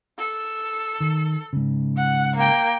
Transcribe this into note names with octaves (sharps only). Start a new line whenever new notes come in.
A4
D#3
G#2 C#3
F#5
A#3 G5